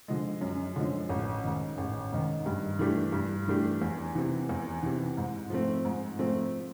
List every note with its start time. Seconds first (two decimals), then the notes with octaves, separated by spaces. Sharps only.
0.08 D3 F3 G#3
0.41 F#2
0.76 D3 F3 G#3
1.10 A1
1.44 G#2 D#3
1.78 A1
2.12 G#2 D#3
2.46 G2
2.79 E3 A3 D4 G4
3.13 G2
3.48 E3 A3 D4 G4
3.82 E2
4.15 C3 E3
4.49 E2
4.83 C3 E3
5.17 G#2
5.50 F3 A3 C4
5.85 G#2
6.19 F3 A3 C4